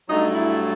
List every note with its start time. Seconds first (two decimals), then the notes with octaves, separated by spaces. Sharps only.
0.08 G2 F#3 A3 D#4
0.34 E4